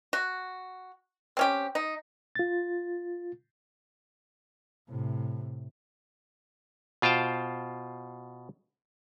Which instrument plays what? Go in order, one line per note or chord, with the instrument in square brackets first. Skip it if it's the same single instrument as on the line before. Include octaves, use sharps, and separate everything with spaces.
[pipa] F#4
C4 C#4 G4
D#4
[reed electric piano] F4 A6
[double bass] A2 C3
[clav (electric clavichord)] B2 F4 C5 G5 A5